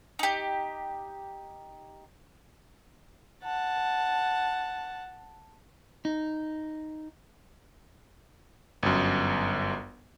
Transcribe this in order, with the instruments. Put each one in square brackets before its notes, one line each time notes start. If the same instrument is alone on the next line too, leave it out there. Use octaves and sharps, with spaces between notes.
[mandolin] D#4 G4
[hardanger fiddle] F#5 A5
[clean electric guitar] D#4
[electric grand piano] G1 F#2